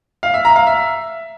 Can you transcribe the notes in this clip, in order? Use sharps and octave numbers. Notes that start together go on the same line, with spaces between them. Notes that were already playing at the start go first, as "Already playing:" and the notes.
F5
E5
A#5
F5
E5